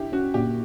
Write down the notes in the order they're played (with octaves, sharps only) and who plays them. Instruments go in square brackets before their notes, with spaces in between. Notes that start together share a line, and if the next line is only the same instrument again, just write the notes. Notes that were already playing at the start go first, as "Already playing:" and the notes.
Already playing: [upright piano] D4 E4 G4
[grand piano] C#4 [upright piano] F#4
[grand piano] A#2 [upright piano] G4